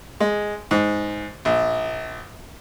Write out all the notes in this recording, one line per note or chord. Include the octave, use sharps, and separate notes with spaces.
G#3
G#2
A#1